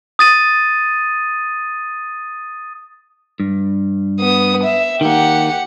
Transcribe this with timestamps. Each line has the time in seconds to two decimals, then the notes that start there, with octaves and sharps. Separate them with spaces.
0.19 D#6 A6 D#7
3.40 G2
4.20 B3 D#6
4.64 E5
5.01 D#3 A#3 G4 F#5